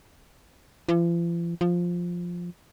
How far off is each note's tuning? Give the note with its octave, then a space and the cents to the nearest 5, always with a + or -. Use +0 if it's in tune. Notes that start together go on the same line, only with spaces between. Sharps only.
F3 -45
F3 +5